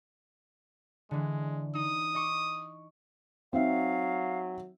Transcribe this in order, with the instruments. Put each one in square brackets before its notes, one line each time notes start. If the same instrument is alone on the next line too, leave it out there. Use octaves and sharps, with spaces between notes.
[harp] D3 E3 [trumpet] G#3
[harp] D#4 [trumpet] D#6
[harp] D#5 C#6 D6
[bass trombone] F#3 [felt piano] C4 D#4 E5 [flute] F5